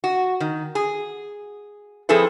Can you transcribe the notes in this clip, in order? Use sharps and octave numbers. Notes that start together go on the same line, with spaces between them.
F#4
D#3
G#4
F3 C4 E4 G#4 A4 B4